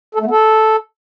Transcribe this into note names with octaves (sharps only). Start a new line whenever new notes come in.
A4
A3
B3
A4